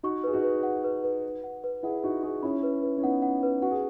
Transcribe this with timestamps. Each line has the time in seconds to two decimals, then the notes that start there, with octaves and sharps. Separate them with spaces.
0.03 D#4 F#4 C#6
0.24 G#4 B4
0.33 D#4 F#4
0.44 B4
0.63 F#5
0.84 B4
1.04 B4
1.24 B4
1.44 F#5
1.64 B4
1.83 E4 G#4 F#5
2.03 D#4 F#4 B4
2.23 E4 G#4 C#6
2.42 C#4 E4 B5
2.63 B4
2.83 B4
2.97 C#4
3.02 B3 D#4 F#5
3.22 F#5
3.43 B4
3.62 F#4 F#5
3.71 G#4